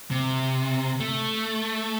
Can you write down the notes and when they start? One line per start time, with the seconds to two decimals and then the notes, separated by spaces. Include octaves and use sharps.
0.11 C3
1.00 A3